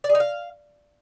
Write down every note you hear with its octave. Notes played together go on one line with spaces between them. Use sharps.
D5
G#4
D#4
F5